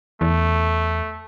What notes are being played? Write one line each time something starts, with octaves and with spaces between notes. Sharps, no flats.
E2 A3